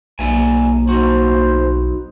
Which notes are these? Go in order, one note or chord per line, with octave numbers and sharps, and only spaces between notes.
B1 A#3 D5 E5 G#5
D#4 F#4 C5